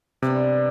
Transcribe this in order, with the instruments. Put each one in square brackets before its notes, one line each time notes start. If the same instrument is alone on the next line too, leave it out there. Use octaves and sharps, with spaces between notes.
[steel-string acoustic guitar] G2 E3 G3 B3 D4 [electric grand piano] C3